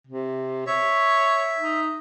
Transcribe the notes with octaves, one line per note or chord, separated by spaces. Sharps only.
C3
C#5 E5
D#4